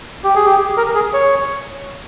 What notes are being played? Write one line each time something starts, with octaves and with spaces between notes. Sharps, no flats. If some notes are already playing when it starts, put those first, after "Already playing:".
G4
G#4
G4
A#4
G#4
C#5